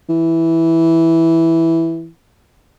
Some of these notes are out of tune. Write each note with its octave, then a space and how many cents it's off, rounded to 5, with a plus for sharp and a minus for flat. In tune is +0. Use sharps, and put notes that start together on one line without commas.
E3 -5